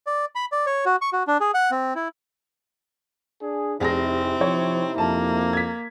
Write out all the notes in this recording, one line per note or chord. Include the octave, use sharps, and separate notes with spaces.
D5
B5
D5
C#5
F#4
C#6
F#4
D4
G#4
F#5
C4
E4
D4 G#4
F1 C3 C4 D#4 E4 G#4 A#6
F3 C#5
F2 A#3 A5
G#6 B6